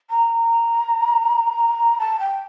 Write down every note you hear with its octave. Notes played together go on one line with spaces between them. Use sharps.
A#5
A5
G5